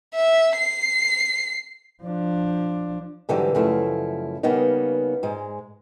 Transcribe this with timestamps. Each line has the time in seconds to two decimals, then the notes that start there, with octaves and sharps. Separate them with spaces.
0.14 E5
0.57 C7
2.03 F3 D4
3.29 G#2 D3 E3 F#3 G3
3.55 F#2 C#3 F3 A3 E4
4.43 C#3 G3 A#3 B3 C#4 D#4
5.23 G#2 G#3